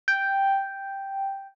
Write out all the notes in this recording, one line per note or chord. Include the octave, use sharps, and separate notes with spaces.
G5